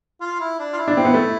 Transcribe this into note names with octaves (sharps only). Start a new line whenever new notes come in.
F4
E4
D4
F4
E4
D4
C4
B3
A3